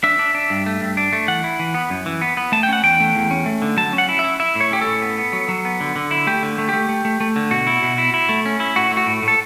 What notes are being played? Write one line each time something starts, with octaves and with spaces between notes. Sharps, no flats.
D4 E5
D4
D4
G2
A3
G2
D4
A3
E3 F#5
E4
E3
B3
F#2
E3
B3
B3
A3 A5
G5
C#4 F#5
E2 G5
A3
E2
C#4
A3
D3
F#3 A5
C#4
F#5
E4
E4 E5
E4 E5
A2
C#5
C#4 G4
A4
A2
B3
B3
F#3
F#3
B3
D3
D3
E4
A3 G4
D3
A3
A3 G4
A3
A3
A3
D3
B2 F#4
E4
B2
E4
E4
A3
C#4
E4
A2 F#4
A3
F#4
A2
A2
A4